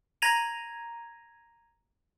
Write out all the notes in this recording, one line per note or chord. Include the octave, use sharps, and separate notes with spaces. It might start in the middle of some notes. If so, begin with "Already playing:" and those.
A#5 G#6 A#6 D#7 F7